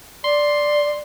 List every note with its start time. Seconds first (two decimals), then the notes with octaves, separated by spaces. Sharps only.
0.24 D5 C6